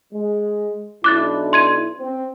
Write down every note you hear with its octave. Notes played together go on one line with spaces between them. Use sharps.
G#3
B1 D4 E4 D6 F#6 A6
C6 G#6 D#7
C4